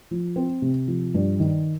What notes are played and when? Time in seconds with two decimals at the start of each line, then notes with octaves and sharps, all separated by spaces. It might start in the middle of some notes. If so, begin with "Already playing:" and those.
0.11 F3
0.36 C4
0.62 C3
0.88 F3
1.14 G2
1.40 D#3